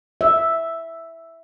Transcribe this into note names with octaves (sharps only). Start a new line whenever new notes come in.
E5